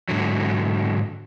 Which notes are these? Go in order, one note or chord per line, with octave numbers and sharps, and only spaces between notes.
G#2 D3 F#3